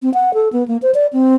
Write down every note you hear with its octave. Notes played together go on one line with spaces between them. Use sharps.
C4
F#5
A4
B3
A#3
C5
D5
C4